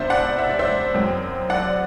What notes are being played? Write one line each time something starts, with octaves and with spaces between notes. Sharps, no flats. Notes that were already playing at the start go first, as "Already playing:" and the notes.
Already playing: C3 G3 B3 D4 C5 E5
D5 F#5
E5
D5
C5 E5
F#2 F#3 C4
D5 F#5